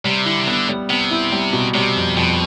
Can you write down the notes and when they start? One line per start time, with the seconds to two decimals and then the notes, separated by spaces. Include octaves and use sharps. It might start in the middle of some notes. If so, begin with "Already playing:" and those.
0.04 C3 G3
0.26 D3 E4
0.39 C3
0.47 D3 B3
0.69 G3
0.90 C3 B3
1.11 E4
1.32 G3
1.53 B2
1.74 C3 G3
1.96 F2
2.17 F2 B2